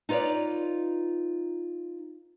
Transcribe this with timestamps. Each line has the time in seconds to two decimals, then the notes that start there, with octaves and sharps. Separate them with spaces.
0.09 D#4 F4 B4 C#5 D5